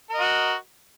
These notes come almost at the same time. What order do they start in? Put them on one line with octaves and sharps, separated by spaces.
A#4 D#5 F#4